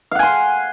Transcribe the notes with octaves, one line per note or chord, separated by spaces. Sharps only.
F5 F#5 G#5 C6